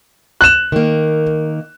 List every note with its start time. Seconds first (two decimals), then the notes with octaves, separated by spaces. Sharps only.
0.41 F#6 E7
0.72 D#3 A#3